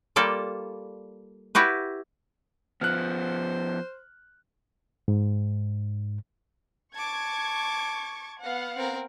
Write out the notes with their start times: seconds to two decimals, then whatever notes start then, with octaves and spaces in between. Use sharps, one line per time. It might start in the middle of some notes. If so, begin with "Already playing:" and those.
0.16 G3 A#3 F4 A4 D5
1.55 E4 F#4 G4 B4
2.81 F3 B3 C5 F6 F#6
5.08 G#2
6.95 A5 C#6 D6 G#6
8.40 B3 F5 F#5
8.76 C4 A#4